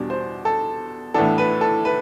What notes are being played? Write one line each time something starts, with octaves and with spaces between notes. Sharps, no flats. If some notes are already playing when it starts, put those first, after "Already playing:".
Already playing: E2 B2 G3 D4
C5
A4
A2 E3 B3 D4 A4
B4
A4
B4